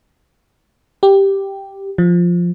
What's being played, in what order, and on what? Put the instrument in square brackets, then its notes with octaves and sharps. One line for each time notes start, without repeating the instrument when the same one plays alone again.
[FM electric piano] G4
F3